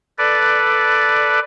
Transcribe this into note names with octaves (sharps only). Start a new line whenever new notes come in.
A4 B4 D5